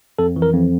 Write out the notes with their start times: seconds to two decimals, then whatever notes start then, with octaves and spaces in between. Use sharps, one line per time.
0.19 F2 A4
0.36 E3
0.42 A#4
0.53 F2